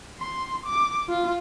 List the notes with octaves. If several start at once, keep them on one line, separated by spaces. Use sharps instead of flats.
C6
D6
F4